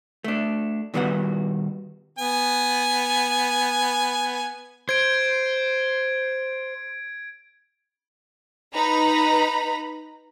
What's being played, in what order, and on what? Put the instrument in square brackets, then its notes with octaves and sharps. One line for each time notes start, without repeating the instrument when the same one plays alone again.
[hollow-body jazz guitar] A3 D4
A#2 D#3 G3 B3 F#4 F#5
[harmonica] B3 G#5
[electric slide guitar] C5 [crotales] G#6 D7
[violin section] D#4 B4 A#5 B5